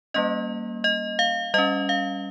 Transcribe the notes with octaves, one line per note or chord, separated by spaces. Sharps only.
G3 A#3 C#4 D#5
D#5
F5
G3 C#4 D#5
F5